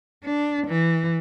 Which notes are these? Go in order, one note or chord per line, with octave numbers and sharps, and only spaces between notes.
D4
E3